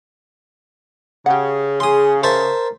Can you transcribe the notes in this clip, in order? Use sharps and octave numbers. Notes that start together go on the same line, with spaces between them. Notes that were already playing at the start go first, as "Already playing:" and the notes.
C#3 G4 F#5
G#4 C6 D#6
A#4 C5 E5 A5